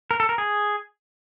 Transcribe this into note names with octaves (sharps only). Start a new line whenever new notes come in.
A#4
A4
A#4
G#4